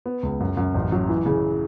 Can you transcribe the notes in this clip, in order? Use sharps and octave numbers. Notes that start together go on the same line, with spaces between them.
B3
C#2
F#2
F#2
A1
F#3
E3
C#3